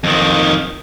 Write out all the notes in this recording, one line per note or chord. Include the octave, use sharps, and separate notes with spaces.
F2 D#3